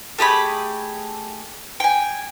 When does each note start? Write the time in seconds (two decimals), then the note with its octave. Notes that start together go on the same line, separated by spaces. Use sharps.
0.18 A3 G4 G#4 B5
1.80 G5 G#5